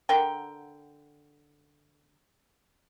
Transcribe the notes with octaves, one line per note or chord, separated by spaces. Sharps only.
D3 A#4 F#5 G5